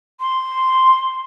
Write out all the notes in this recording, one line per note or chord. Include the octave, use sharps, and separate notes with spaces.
C6